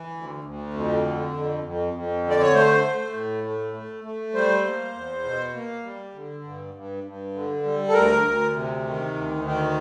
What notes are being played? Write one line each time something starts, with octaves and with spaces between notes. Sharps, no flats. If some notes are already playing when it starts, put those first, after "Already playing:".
Already playing: E3
D2
D2
F2
D3
F2
F2
F2
D3
D5
C#5
A3 C5
A3
A2
A3
A3
A3
G3 C5
A#3
E2
B2
A#3
G3
D3
G2
G2
G2
D3
G3
A4
D2 A#4
D2
C3
D#3
D2
D#3